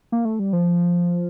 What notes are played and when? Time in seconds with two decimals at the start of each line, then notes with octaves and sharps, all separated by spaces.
0.12 A#3
0.25 A3
0.39 G3
0.53 F3